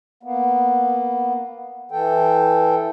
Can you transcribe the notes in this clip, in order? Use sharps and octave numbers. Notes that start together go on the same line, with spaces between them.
A#3 B3
E3 A4 G5